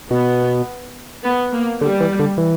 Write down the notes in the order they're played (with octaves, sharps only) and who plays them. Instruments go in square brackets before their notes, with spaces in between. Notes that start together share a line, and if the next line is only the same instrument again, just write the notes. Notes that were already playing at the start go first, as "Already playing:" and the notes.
[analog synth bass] B2 [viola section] B3
[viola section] B3
A#3
[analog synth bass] D3 [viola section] G3
[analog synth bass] E3
D3
E3